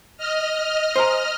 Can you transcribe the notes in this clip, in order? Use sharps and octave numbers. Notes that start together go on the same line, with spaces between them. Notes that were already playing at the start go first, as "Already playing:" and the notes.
D#5 F6
C5 G#5 A#5